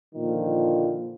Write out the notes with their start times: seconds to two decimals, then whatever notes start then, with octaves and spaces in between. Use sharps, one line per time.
0.16 A#2 D3 D#3 F3